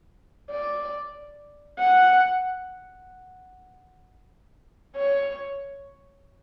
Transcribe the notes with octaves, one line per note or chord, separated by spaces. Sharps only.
D5
F#5
C#5